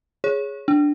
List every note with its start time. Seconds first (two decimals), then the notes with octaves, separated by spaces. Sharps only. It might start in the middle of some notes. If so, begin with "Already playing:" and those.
0.24 G#4 C#5
0.68 D4